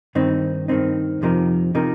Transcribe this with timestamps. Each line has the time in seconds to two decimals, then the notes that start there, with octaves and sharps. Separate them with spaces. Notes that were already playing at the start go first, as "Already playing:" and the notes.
0.15 G2 D#3 C4 D#4
0.68 G2 D#3 C4 D#4
1.22 F2 C3 F3 D#4 A#4
1.75 C3 F3 D#4 A#4